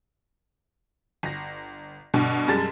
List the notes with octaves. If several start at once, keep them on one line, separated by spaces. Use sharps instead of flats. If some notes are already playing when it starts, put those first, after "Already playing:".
G1 A#6
G2 B2 D3
F#2 G3 G#3 A5 A6